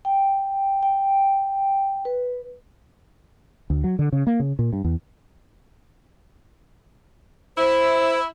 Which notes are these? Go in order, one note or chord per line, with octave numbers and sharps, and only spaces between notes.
G5
G5
B4
D2
F#3
D3
C#3
A#3
C#3
A#2
G2
E2
E4 C5